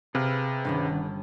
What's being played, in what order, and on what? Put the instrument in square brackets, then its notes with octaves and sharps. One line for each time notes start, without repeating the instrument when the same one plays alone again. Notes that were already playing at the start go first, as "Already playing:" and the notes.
[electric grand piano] C3 [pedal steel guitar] G#4 B4 F5
[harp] G1 [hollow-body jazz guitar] D3 D#3 C#4